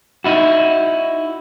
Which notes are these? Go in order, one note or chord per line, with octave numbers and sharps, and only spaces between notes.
D#4 E4 F#4